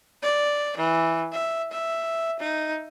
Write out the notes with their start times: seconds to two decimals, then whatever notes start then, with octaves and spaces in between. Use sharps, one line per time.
0.23 D5
0.78 E3
1.32 E5
1.72 E5
2.40 D#4